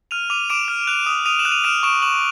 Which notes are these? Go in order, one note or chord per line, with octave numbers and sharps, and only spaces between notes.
F6 D#7 F7
D6 D#7 F7
D6 D7 E7
F6
F#6 D#7 F7
D#6
D#6 D#7 F7
E7 F#7
F#6
D#7 F7
F6 D7 E7
C#6 D7 E7
C#6 E7 F#7